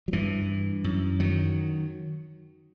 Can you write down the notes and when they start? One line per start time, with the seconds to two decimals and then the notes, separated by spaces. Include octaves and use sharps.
0.08 F#3
0.13 G2 E3
0.84 F#2
1.20 D#3 F#3